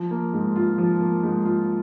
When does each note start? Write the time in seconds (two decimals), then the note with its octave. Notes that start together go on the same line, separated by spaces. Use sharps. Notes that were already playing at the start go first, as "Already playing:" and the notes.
Already playing: F3
0.11 A#3
0.33 G#2
0.56 F4
0.78 F3
1.00 A#3
1.23 G#2
1.45 F4